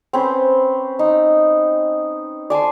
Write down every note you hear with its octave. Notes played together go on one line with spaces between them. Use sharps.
C4 C#4 B4 C5
D#4
D5 G#5 A5 C6